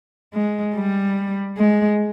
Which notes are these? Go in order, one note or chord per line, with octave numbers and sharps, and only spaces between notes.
G#3
G3
G#3